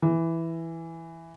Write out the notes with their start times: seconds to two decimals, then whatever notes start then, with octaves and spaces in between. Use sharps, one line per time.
0.02 E3